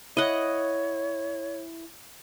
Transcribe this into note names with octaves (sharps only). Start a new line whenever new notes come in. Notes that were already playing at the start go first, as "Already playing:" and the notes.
E4 C#5 D#5 F#5